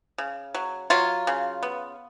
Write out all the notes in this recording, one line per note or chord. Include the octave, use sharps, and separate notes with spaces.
C#3
F#3
F#3 F4
C#3
B3